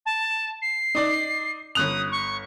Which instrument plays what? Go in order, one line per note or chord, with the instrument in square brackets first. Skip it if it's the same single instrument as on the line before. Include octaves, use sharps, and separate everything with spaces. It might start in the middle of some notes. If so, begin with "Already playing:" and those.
[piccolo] A5
C7
[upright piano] D#4 D5
[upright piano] G1 F#6 F7 [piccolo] D#6
[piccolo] C#6